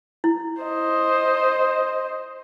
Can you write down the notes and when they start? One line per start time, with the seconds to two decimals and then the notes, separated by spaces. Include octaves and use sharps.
0.24 E4
0.62 C5 D#5